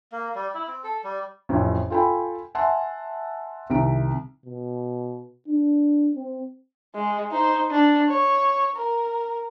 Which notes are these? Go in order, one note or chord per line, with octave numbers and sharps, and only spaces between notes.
A#3
G3
E4
C4
A4
G3
A1 F2 A2
F4 A4 G5 G#5 B5
E5 F#5 G#5 A5 C6
C2 C3 D#3 D7
B2
D4
C4
G#3
D#4 C5
D4
C#5
A#4